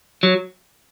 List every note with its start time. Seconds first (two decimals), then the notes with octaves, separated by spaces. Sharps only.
0.23 F#3